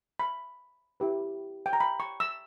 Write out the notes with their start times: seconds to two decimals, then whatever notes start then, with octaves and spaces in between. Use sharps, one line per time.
0.19 B5
1.00 E4 G4 B4
1.66 G5
1.73 A#5
1.80 B5
2.00 C#6
2.20 E6